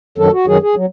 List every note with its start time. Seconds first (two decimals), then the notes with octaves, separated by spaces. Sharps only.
0.18 F#2 D#3 F#3 A4
0.33 F#4
0.47 F#2 D#3 F#3 G#4
0.62 G#4
0.76 F#3